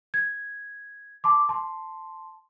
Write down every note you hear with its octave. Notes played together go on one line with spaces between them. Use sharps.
G#6
A5 C6 D6
A5 C6